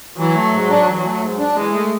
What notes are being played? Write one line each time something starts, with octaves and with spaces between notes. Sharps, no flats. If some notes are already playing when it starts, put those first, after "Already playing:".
E3 F#3
A3
G#2
D4
E3
A3
G#2
D4
E3 G#3
A3